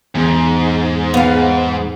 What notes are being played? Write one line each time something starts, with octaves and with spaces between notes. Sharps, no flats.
E2 G#2
B3 F5